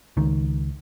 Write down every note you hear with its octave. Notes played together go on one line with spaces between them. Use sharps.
C#2 D#3